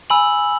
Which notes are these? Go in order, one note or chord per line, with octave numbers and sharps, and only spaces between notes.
G#5 B5 E6 F#7